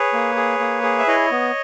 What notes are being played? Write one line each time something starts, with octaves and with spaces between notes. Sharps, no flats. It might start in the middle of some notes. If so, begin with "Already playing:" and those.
Already playing: G#4 B4 C#5
A#3
G#4
A#3
G#4
E5
E4 C#5 D#5
B3